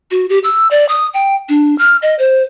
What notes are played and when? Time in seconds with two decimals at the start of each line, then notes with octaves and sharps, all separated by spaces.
0.11 F#4
0.30 G4
0.44 E6
0.71 D5
0.89 D#6
1.14 G5
1.49 D4
1.78 F6
2.02 D#5
2.19 C5